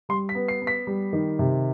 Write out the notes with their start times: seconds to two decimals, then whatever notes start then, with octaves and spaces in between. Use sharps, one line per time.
0.09 G3 C6
0.29 B6
0.35 B3
0.48 C7
0.62 B3
0.67 B6
0.87 G3
1.13 D#3
1.39 C3